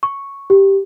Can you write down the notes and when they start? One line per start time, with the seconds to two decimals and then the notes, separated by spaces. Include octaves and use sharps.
0.03 C#6
0.50 G4